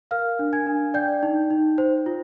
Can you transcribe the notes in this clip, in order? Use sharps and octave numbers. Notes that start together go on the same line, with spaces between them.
A#4 F5 F6
D4
G#5 G#6
D4
D5 G5 G6
D#4
D#4
C5
F4